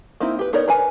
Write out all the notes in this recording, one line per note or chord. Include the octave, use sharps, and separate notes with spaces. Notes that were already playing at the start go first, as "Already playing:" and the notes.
A#3 C4 D#4 E4
G4 B4
B3 D#4 A#4 C#5 D5
A#4 B4 G#5